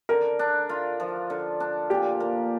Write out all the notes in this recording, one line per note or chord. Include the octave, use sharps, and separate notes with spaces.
D3 A#4
D4
F4
F3
D3
D4
A#2 G4
A#3